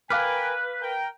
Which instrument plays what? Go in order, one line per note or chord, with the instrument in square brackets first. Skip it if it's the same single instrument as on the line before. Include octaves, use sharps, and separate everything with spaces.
[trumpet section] A#4 G5 G#5 [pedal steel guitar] B4 [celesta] F5 D6 F6
[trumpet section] A#4 G5